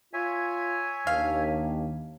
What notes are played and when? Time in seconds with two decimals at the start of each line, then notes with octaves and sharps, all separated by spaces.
0.13 F4 C#5 E5 G#5
1.07 D#2 D4 F5